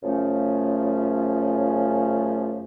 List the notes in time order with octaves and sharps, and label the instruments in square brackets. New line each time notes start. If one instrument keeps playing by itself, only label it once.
[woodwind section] F#2 C#3 F3 A3 C#4